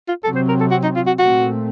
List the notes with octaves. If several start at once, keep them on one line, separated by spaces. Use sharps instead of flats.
F4
C3 F#3 C4 A4
C5
A#4
A4
F#4
D#4
F4
F#4
A#2 A3 C4 F#4